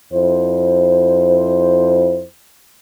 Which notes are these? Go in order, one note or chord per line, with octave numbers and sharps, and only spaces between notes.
F2 E4 C5